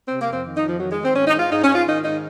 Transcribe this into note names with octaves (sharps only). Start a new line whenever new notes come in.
C3 C4
A#3
F2
C4
D#3
D#4
F2
F3
D#3 F#3
G#3
D#3
C4
G#2 C#4
D#4
G#2
F4
G#2 D#4
C#4
G#2
F4
D#3 D#4
G#2 D#4